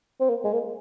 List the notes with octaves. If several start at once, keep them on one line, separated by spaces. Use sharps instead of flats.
C4
A#3
G#3
A#3